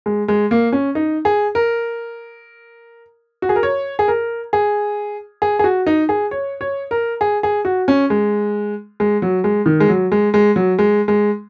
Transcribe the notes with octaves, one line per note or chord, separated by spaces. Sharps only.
G#3
G#3
A#3
C#4
D#4
G#4
A#4
F#4
G#4
A#4
C#5
G#4
A#4
G#4
G#4
G#4
F#4
D#4
G#4
C#5
C#5
A#4
G#4
G#4
F#4
C#4
G#3
G#3
F#3
G#3
D#3
G#3
F#3
G#3
G#3
F#3
G#3
G#3